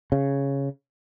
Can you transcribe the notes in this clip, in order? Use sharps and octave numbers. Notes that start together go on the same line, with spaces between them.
C#3